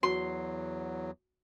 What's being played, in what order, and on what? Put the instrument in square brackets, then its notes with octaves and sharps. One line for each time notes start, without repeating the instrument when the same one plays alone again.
[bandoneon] E2 F#3 [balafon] F#4 [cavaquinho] C6